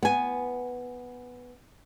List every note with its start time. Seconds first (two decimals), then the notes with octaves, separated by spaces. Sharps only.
0.03 B3 G#5